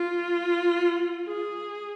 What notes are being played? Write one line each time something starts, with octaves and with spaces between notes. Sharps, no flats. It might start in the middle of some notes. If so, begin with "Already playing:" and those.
Already playing: F4
G#4